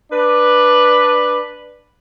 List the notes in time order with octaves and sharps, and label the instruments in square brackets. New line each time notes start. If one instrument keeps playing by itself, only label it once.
[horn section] D4 B4